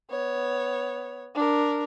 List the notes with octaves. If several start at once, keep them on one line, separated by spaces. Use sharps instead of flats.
B3 C#5
D4 A#4